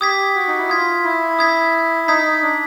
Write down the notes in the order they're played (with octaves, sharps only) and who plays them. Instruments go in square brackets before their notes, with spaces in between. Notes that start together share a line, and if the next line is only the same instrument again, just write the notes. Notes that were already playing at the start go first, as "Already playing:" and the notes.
[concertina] G4 [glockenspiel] D#6 G#6 B6
[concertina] F#4
D#4
E4
[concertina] F4 [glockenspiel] D#6 G#6 B6
[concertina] E4
[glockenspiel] D#6 G#6 B6
[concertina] D#4 [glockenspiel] D#6 G#6 B6
[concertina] D4